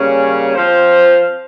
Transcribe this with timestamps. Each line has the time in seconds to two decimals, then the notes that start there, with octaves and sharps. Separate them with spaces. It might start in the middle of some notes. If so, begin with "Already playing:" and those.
Already playing: C#3 G3 A#3 C#4
0.55 F3 C4 F4 C5